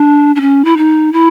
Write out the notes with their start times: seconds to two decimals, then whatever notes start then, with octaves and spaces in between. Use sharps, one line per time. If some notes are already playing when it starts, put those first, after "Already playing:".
Already playing: D4
0.36 D4
0.41 C#4
0.65 E4
0.77 D#4
1.13 E4